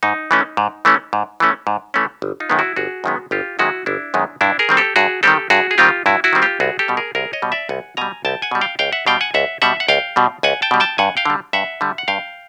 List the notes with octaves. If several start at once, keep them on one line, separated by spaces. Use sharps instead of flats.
G#2 D#4
E3 A3 C#4
G#2
E3 A3 C#4
G#2
E3 A3 C#4
G#2
E3 A3 C#4
G1
D#4 F4
F#2 D#3 G#3 B3
E4 F#4
G1 F#4 G#4
F#2 D#3 G#3 B3
G1 F4 G4
F#2 D#3 G#3 B3 E4 F#4
G1 D4 E4
F#2 D#3 G#3 B3
G2 D4 E4
G#4 A#4
D#3 G3 C4
G4 A4
G2 F#4 G#4
D#3 G3 C4 G4 A4
G2 F#4 G#4
G#4
D#3 G3 C4 F4 G4
G2 E4 F#4
E4 F#4
D#3 G3 C4
F4 G4
C2 F#4 G#4
G4 A4
B2 G3
G#4 A#4
C2 G#4 A#4
C#5 D#5
B2 G3
D5 E5
C2 F#5 G#5
B2 G3 G#5 A#5
C2 G5 A5
F#5 G#5
B2 G3
F5 G5
C#2 F5 G5
E5 F#5
B2 G3 F5 G5
F#5 G#5
C#2 E5 F#5
B2 G3 E5 F#5
F#5
C#2 F5 G5
B2 G3
C#2 F#5 G#5
G5 A5
B2 G3
G5 A5
G2 F#5 G#5
F5 G5
D3 G3
G2 E5 F#5
D3 G3
F#5
G2 F5 G5